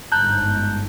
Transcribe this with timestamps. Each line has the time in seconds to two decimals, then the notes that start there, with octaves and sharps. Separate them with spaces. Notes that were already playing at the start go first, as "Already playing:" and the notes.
0.12 G1 G#2 A5 A#5 F#6 G6